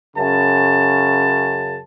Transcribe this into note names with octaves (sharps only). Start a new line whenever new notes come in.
F#2 C#3 A5